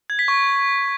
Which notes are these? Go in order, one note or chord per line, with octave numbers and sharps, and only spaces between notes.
G#6
B6
C#6